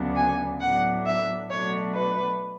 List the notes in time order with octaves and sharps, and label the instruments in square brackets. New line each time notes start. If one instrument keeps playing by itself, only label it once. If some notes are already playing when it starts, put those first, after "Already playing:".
Already playing: [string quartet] D2 C#3 F#3 B3 D4
G#5
A2 F#3 B3 D4 F#5
E5
B2 F#3 A3 D4 C#5
B4